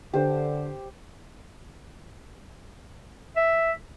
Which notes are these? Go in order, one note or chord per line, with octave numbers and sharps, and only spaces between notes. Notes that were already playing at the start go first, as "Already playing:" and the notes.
D3 G4 C5
E5